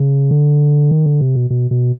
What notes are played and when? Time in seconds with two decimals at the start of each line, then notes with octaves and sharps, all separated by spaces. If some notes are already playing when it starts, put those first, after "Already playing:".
Already playing: C#3
0.31 D3
0.91 D#3
1.06 D3
1.21 C3
1.35 B2
1.50 B2
1.71 B2